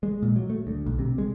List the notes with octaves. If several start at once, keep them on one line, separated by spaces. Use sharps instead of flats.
G#3
A#2
F#3
A3
D2
B1
C3
G#3